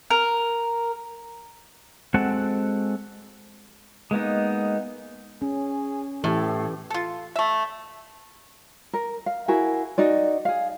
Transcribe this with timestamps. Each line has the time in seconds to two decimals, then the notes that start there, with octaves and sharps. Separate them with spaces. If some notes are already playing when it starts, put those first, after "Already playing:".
0.10 A#4
2.14 G#3 C4 F#4 A4 F#5
4.11 G#3 A#3 B3 D#4
5.42 C#4 G#4
6.24 A2 E3 G4 A4
6.90 F4 A4
7.36 A3 E5
8.94 A#4
9.26 F5
9.48 E4 F#4 G#4 A#4
9.98 D#4 F#4 D5
10.45 G#4 F5